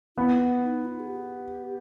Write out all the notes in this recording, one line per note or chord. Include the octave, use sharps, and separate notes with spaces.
B3 E4
D#4
F4
G#4
G4